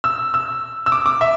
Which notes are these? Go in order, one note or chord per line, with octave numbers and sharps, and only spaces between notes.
E6
E6
E6
D6
D6
E5